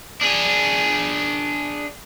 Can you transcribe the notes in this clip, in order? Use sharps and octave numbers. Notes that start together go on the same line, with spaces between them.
D4 G#4